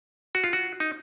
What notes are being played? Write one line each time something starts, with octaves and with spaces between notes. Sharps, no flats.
F#4
F4
F#4
D#4